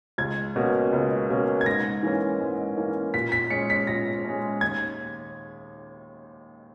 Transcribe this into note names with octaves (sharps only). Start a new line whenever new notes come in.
C#2 G#6
B2 A#3 C#4
C#2
B2 A#3 C#4
G#6
G#2 A#6
E3 A#3 C#4
G#2
E3 A#3 C#4
A#2 B6
B6
G#3 C#4 C#7
B6
A#2 A#6
G#3 C#4
D#2 G#6